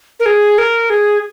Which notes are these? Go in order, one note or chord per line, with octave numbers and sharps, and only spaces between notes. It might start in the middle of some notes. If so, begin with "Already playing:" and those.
A#4
G#4
A#4
G#4